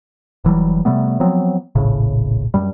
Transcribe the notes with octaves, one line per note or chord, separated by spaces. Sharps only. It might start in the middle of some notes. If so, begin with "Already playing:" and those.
F1 E3 F#3 G3
C3 G3 A3 B3
F3 F#3 B3 C4
D#1 A#1 A2 C#3
F#2 G3